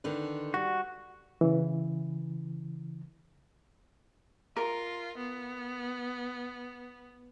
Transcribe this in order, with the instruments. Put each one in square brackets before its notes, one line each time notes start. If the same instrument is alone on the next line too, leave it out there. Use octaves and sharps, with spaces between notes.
[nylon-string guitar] D3 D#3 B4
[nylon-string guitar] G3 [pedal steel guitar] F#4
[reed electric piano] C#3 E3
[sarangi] F4 [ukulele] A#4
[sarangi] B3